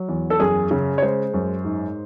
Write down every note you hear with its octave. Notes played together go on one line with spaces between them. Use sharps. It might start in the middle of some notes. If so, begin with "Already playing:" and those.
Already playing: F#3
E2
A4
F#2 G#4
C#3
C#5
G#3 C5
F#2
G#2